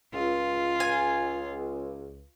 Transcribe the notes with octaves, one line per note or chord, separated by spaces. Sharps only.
C#2 F4
G#5